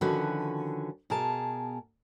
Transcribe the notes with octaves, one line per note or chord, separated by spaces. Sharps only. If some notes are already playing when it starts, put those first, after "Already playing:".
D3 D#3 F3 C#4 F#4 B4
B2 G#4 A#4 A5